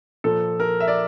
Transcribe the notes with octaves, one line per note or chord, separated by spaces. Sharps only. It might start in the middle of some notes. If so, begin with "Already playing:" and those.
A#2 F3 A4
A#4
E5
D5